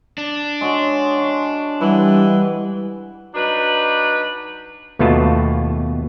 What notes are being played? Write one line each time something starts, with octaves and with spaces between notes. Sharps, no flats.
D4
G#3 C#4 F#4
C6 C#6
E3 G3 B4 F#5
F#3 D4 D#4 B4
D#2 B2 A3 B3 F4 A5